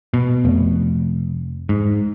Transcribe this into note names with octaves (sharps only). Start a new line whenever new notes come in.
B2
F1
G#2